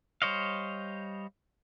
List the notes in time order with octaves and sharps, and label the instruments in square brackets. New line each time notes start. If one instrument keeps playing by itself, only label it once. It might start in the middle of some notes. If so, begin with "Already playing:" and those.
[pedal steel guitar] G3 C5 C#5 D#5 F5